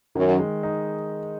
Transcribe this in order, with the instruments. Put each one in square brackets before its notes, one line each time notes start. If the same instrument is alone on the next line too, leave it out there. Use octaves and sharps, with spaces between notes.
[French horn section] F#2 [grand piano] D#3
[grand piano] G#3
D#4